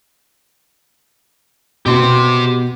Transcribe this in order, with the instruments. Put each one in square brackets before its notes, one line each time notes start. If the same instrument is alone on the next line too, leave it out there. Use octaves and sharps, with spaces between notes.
[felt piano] B2 B3 [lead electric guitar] G4 C6